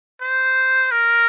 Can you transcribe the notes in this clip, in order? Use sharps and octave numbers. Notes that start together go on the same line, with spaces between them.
C5
A#4